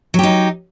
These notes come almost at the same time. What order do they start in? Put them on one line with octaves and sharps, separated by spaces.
F#3 G4 D#4